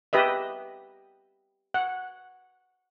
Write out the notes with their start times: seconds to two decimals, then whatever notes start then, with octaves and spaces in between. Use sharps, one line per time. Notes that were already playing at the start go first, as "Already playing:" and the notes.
0.13 G4 B4 D#5 E5
1.74 F#5